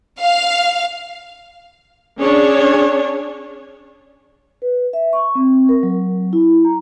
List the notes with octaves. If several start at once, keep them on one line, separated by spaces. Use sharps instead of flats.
F5
C#4 D4 G#4 C#5
B4
E5
C#6
C4
A#4
F#3
E4
A#5